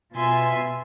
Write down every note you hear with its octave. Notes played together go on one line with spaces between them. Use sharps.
B2 F4 E5 G#5 C6